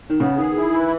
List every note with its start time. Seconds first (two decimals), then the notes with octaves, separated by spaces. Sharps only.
0.10 D#3
0.20 C#3 B3
0.37 D#3 G#4
0.55 E4
0.73 E3